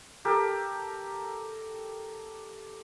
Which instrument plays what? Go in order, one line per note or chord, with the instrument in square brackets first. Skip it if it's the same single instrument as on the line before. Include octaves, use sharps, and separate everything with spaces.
[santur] G4 A4 A#4